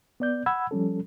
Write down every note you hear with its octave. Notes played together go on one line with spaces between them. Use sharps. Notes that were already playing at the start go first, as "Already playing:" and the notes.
B3 D5 G6
F#5 B5 E6 G#6
F3 G3 C#4 A4